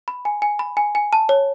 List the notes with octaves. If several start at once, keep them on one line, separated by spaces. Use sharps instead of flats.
B5
G#5
G#5
B5
G#5
G#5
A5
C#5